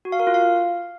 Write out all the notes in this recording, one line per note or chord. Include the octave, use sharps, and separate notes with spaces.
F#4
F5
A#4
F4
F5